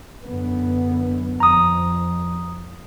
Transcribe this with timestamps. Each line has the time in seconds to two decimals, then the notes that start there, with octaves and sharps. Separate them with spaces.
0.22 F#2 D3 B3
1.40 F2 A#5 D#6